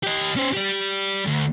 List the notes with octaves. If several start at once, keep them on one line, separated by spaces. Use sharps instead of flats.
G4 D#5
C#4 C5
G3 G4
D2